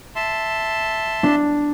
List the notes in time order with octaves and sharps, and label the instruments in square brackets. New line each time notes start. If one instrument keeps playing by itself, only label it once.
[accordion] E5 A5 C6
[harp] D4